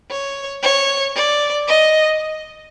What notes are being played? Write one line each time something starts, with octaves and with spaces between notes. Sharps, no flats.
C#5
C#5
D5
D#5